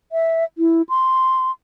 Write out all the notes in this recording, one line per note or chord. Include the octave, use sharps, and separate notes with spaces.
E5
E4
C6